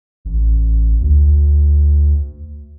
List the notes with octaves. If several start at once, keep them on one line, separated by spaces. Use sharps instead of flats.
A1
D2